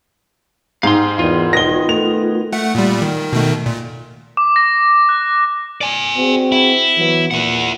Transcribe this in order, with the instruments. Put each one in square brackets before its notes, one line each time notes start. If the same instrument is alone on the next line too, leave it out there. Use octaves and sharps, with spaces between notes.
[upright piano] G#2 [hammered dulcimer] D#4 G4 [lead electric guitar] F5 C6
[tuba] E2 [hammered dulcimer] D#3 E4 [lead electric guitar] F4
[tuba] E1 [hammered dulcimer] D#3 B3 G#4 [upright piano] A#6 G7
[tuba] A3 [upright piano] F7
[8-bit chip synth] A3 F#5
A#2 G3
D#3
B2 D#3 A3
A#2
[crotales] D6
A#6
F#6
[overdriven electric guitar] D5 G#5
[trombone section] C4 F#4 G#4
[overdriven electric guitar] E4
[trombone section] E3 F#3 B3
[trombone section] A#2 [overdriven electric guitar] E4 F#5